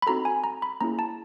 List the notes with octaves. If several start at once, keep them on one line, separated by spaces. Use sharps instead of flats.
B5
C4 D#4 F#4 A4 A#5
G#5
A#5
B5
A#3 C#4 E4 G#4 A#5
A5